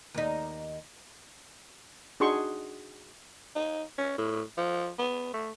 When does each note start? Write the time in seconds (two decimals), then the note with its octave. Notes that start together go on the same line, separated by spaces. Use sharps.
0.14 D#2 D#4
2.20 D4 D#4 F#4 G#4 C6 C#6
3.55 D#4
3.98 C#4
4.18 A2
4.57 F3
4.99 B3
5.33 A3